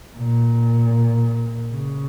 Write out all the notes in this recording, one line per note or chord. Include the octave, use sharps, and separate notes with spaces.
A#2
C#3